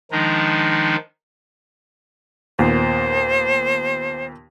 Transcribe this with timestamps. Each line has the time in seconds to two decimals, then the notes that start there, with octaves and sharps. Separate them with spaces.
0.12 D#3 F3 G#3 D4 D#4
2.59 D#2 A#2 B3 C5